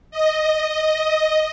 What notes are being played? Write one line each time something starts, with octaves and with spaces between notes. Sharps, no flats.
D#5